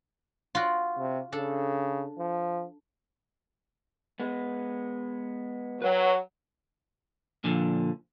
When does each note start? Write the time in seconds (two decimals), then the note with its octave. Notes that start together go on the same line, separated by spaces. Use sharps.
0.55 F4 F#4 D5
0.98 C3
1.32 C#3 D4 A4
2.19 F3
4.20 G#3 B3
5.82 F#3 B4 F#5 G5
7.44 A#2 D3 F3